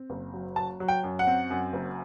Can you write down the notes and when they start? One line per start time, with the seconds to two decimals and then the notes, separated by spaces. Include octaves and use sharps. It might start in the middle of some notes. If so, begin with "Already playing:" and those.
Already playing: C4
0.10 F#1
0.33 F#3
0.56 F#3 A5
0.80 F#3
0.88 G5
1.04 F#2
1.19 F#5
1.27 C4
1.50 F#2
1.73 F#1